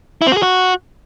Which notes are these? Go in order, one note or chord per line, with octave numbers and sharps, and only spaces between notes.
E4
C4
F#4
G#4
F#4